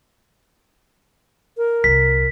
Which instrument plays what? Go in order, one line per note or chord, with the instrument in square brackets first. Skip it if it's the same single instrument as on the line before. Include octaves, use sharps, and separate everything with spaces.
[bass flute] A#4
[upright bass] C2 D3 [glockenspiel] B6